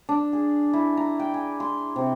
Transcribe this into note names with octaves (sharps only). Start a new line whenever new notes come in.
D4
G#4
E4
A#5
G5
G#5
C6
C3